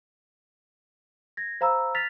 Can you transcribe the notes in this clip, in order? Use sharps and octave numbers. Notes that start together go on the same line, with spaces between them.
G#6 A#6
C5 F5 A#5 B5 E6
F6 A6 B6 F7